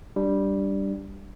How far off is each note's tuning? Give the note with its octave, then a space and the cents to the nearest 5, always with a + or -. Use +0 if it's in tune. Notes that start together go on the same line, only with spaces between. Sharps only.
G3 -5 D4 +0